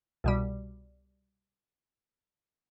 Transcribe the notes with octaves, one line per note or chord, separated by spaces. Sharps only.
C2 B2 G3